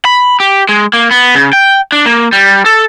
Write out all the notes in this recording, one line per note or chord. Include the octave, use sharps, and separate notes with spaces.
B5
G4
G#3
A#3
B3
C#3
G5
D4
A#3
G3
A4